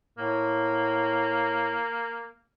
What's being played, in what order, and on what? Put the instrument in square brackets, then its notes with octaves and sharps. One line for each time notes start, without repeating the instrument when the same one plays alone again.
[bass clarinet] A2 [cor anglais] A#3